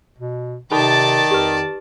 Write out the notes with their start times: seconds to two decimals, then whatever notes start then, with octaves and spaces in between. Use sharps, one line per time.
0.18 B2
0.72 C3 D#3 D#4 A4 D5 A5 B5
1.31 F2 G4 B4